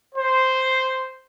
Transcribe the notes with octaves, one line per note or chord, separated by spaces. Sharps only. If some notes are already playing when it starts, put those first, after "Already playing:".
C5